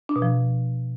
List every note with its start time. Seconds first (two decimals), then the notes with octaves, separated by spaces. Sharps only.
0.09 D4
0.16 B2
0.22 F3